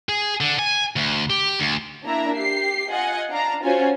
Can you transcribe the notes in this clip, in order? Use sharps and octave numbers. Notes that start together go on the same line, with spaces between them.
G#4
D3
G#5
D2
G4
D2
A#3 D4 E4 E5 A#5
G4 C7
F4 D#5 F#5 G#5
D4 F5 A#5
C#4 F4 F#4 C5 G#5